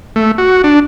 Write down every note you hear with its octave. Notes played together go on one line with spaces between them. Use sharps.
A3
F#4
D4